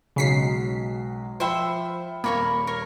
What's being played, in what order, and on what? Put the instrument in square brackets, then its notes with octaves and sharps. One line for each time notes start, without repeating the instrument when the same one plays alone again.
[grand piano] B1 F#3 G#3 [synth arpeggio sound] C#3 B6 C7
[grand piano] F3 B5 C#7 [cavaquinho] C5 E5 G5
[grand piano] D#1 [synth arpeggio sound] A#3 [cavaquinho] A#4 C#5 B5
[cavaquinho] A#4 C#5